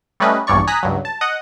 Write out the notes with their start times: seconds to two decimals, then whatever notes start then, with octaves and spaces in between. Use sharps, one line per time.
0.20 G3 A3 C#4 B4 D#5
0.47 A#1 E2 G2 C#5 D5 C#6
0.67 G#5 A#5 D#6 F#6 B6
0.83 C#2 G2 F#3
1.05 A5
1.21 D#5 F#5 D#6